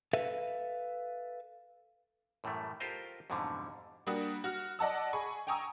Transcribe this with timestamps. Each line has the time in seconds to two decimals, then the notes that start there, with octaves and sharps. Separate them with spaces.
0.13 A4 B4 E5 F5
2.44 F#2 A2 E3 G3 A3
2.80 F4 G4 A4 A#4 C5 D#5
3.30 F2 G#2 B2 D3 E3 G3
4.07 G3 A#3 D4 F#4 D#6
4.44 F#4 F6
4.79 D5 D#5 F#5 A5 E6
5.13 G#4 G#5 B5 C#6
5.47 G5 G#5 A#5 C#6 D#6 E6